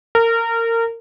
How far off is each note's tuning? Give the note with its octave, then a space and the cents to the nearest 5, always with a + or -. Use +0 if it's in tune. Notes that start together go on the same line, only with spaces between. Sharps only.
A#4 -25